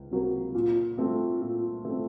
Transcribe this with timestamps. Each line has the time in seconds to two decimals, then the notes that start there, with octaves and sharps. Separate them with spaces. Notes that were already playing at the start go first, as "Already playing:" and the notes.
Already playing: C#2
0.11 C3 F#3 A#3
0.55 A#2
0.97 A3 C4
1.41 A#2
1.85 A3 C4